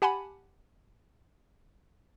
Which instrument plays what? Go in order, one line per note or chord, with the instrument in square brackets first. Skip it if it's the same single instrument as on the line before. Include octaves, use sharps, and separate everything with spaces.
[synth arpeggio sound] G4 F#5 G#5 A5 B5